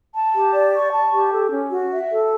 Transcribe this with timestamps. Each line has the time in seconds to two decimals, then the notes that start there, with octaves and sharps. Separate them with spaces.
0.14 A5
0.34 G4
0.53 D5
0.74 C#6
0.93 A5
1.12 G4
1.32 A4
1.52 C#4
1.71 F#4
1.92 E5
2.11 A4